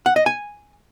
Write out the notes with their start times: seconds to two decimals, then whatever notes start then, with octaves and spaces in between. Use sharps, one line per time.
0.06 F#5
0.16 D#5
0.26 G#5